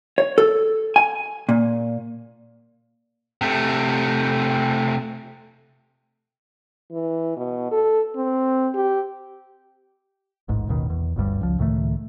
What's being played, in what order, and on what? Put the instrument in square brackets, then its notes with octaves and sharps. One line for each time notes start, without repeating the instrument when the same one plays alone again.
[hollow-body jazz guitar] C#5
A4
G#5
A#2
[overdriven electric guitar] C3 A3
[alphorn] E3
B2
A4
C4
G4
[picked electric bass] D#1 A1 G#2
A1 D#2 B2 D#3
E2
G1 D2 G2 G3
C#2 F3
C#2 A2 D#3 A3